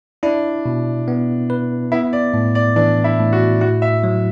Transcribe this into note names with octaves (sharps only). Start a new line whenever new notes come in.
D4 E4
B2
B3
B4
B3 E4
D5
A2
D5
E3 D4
E4
A2
F#4
E4 F#4
E5
F#3